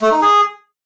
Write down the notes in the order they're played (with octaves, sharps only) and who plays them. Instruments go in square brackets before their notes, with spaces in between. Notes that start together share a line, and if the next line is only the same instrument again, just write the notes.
[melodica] A3
D#4
G#4